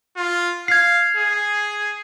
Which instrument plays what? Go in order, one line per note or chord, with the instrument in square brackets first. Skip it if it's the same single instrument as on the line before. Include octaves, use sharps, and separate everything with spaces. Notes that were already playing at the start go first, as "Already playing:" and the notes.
[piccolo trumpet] F4
[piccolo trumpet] F5 [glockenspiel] G#6 C7
[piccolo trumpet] G#4